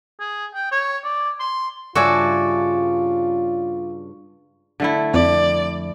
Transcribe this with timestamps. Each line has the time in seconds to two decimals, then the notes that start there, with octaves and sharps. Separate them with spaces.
0.19 G#4
0.54 G5
0.71 C#5
1.04 D5
1.40 C6
1.95 G2 C#3 D4 F4 F#4 D5 E5 G#5
4.80 D3 A3 E4
5.14 F2 D5